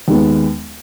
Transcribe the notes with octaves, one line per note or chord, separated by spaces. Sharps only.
D#2 D#3 G#3 B3